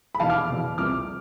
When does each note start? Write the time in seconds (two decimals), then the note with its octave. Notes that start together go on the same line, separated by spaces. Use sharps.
0.15 B5
0.20 F1 E2 B2 F5 A5
0.30 D6 F6
0.49 F1 E2 B2
0.78 C2 C3 F3 D6 F6